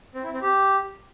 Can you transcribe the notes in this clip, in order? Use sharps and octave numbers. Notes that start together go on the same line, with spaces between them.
C4
E4
C4
G4